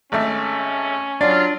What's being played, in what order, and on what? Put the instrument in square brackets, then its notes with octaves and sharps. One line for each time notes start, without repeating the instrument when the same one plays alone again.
[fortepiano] G#1 A3 [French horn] C#4
[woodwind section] F#3 F4 [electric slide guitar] D4 [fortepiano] D5